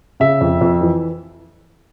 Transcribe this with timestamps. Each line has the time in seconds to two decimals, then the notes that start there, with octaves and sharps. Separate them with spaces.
0.20 C#3 E5
0.41 F2
0.61 F2
0.81 E3